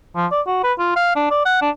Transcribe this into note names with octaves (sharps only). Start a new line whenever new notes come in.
F3
D5
F#4
B4
F4
F5
D4
D5
F#5
D4